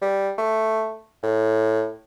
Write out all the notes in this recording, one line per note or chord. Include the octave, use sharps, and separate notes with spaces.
G3
A3
A2